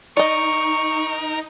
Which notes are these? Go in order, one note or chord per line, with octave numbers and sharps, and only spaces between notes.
D#4 A#4 D5 D#5 C#6